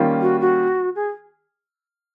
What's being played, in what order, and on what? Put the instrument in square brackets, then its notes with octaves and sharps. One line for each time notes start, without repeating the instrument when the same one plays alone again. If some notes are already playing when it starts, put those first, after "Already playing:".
Already playing: [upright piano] D#3 G3 A#3 C#4 F4
[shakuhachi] F#4
F#4
G#4